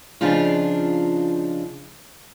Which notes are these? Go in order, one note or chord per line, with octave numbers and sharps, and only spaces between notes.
C#3 F3 D4 D#4 F4